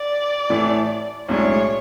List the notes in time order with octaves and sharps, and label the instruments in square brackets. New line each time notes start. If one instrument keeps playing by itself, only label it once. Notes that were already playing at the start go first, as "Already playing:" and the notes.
Already playing: [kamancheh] D5
[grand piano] A1 A2 E3 A3
[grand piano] B1 A2 G#3 D4 [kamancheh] C#5